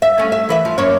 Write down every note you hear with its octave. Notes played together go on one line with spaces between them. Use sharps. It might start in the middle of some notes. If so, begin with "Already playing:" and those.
E5
A3 C#4
E5
E3 B4 E5
F3
F#2 A#3 C#5